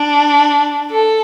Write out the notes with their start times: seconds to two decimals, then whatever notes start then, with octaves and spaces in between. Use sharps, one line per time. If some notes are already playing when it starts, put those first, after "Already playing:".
Already playing: D4
0.91 A4